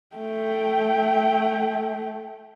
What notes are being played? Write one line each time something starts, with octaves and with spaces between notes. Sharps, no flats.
A3 G5